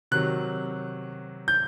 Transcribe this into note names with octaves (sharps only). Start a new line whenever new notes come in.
C3 D#3 F#3 F#6
G6